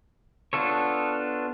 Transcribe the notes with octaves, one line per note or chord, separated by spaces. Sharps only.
B3 D4 F4 A4 C#5